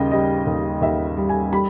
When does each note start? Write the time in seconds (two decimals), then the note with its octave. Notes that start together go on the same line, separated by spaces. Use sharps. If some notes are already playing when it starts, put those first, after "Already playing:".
Already playing: D#2 C#3 G3 D#5 G5
0.11 G3 D#5
0.47 D#2
0.81 D#2 E5
1.17 G3
1.29 G#5
1.52 G3 B5